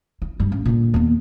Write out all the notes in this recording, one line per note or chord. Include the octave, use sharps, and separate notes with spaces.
E4
G2 F#3
A1
A#2 D3
D#2 B3